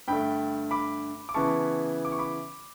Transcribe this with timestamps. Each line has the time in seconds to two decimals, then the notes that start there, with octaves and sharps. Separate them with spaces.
0.08 G2 D3 A3 G5 B5
0.71 B5 D6
1.29 D6
1.34 C#3 E3 B3 A5 C#6
2.05 D6
2.12 C#6
2.19 B5 D6